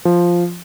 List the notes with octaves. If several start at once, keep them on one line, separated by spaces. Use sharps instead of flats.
F3